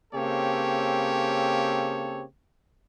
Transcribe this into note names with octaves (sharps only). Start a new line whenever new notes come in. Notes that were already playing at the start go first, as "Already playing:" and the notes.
C#3 A#3 C4 G4 A4 C#5